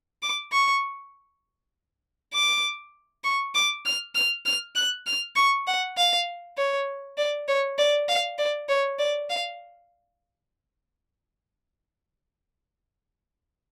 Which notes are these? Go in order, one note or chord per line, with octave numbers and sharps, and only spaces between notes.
D6
C#6
D6
C#6
D6
F6
F6
F6
F#6
F6
C#6
F#5
F5
C#5
D5
C#5
D5
F5
D5
C#5
D5
F5